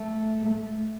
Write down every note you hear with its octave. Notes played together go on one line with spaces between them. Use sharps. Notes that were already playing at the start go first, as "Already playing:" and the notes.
Already playing: A3
A3